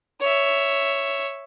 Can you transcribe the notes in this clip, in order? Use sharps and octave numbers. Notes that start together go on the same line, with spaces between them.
C#5 E5